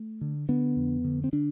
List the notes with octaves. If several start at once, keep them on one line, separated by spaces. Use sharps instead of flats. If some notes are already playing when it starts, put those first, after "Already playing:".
Already playing: A3
D3
D3 B3
F2
D3
C4
D3 D4